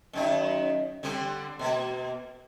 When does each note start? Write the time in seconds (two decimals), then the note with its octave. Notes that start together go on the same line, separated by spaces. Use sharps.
0.13 F#2 D#3 D#4
1.03 D3 G3 C4
1.59 B2 A#3